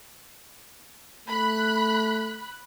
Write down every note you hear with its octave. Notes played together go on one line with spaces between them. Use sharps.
A3 B5 F#6